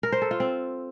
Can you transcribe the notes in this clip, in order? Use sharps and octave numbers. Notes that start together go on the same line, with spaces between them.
A#4
C5
A4
F4
C4